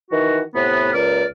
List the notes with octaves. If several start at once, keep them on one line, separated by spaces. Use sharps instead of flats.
D#3 E3 F#4
A2 C3 B3
C#2 A#3 D5 F6